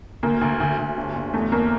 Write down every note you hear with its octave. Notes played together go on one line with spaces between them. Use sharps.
D2 A#3
D2
D2
D2
G1
G1
E2 A3
E2 A#3